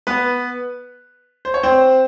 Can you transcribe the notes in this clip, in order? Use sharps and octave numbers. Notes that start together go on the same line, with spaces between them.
B3 B4
C5
C#5
C4 C5